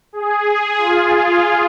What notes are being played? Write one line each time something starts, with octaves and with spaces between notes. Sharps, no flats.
G#4
F4